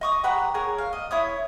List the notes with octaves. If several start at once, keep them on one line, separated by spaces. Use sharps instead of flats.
D#5 C#6 D#6
G4 B4 F#5 A#5
G#4 A#4 C#5
F5
D#5
E4 C#5 D#6